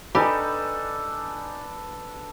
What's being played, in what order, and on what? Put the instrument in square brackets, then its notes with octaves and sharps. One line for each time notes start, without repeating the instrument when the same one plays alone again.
[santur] D4 A4 B4 [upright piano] D#4 G#5 B5 [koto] G4